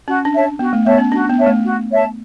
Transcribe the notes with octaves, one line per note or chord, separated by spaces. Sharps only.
C#4 F#4
D4
C#5 E5 A5
B3 F#4
A3
B3 C#5 E5 A5
C#4
D4 F#4
B3
C#5 E5 A5
A3
F#4
C#5 E5 A5